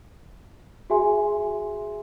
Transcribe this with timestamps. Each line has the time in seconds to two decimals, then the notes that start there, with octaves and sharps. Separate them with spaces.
0.90 F#4 G#4 E5 G#5 C6